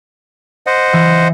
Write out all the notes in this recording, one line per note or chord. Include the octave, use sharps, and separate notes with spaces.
C5 D#5 F#5
E3